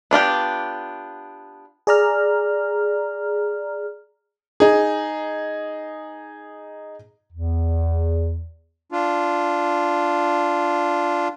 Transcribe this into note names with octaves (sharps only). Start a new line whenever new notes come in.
B3 D4 F4 G4
G#4 D5 A#5 F6
D#4 G#4
E2
D4 F4